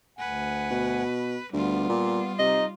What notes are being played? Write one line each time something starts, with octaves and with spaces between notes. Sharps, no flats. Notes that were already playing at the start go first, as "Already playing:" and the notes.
D2 B4 F#5 G#5
B2
D2 G3 B3 F4
A#2
C3 D#4 D#5